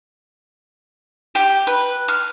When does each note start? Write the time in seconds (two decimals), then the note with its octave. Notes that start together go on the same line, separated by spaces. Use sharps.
1.35 G4
1.67 B4
2.08 F6